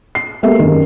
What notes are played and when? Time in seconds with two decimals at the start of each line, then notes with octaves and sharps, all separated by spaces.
0.15 C7
0.43 G#3 A#3 B3 G4 A4 E5
0.60 F#2 D#3